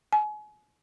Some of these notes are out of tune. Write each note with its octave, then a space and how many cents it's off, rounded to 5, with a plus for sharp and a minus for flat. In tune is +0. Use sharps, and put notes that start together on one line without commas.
G#5 +35